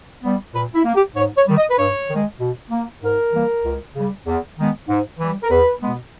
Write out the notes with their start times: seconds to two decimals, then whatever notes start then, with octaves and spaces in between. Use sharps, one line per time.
0.23 G3 B3
0.54 A#2 B4
0.75 E4
0.85 A#3
0.95 G4
1.16 G#2 C#5
1.37 C#5
1.47 D#3 G3
1.58 D#5
1.71 B4
1.78 G2 C#5
2.09 D#3 G#3
2.40 B2
2.71 A#3
3.03 G#2 A#4
3.33 E3 G3 A#3
3.64 C#2
3.96 C#3 G3
4.27 E2
4.57 D#3 G#3 B3
4.89 G#2
5.20 E3 G3
5.43 A#4
5.51 E2 B4
5.82 B2 G#3 B3